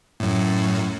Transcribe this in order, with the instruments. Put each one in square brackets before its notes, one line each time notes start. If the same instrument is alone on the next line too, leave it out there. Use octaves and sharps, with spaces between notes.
[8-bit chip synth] F#2 A2